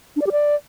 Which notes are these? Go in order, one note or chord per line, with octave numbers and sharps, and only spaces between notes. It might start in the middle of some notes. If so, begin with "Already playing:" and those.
D4
D5
G4
D5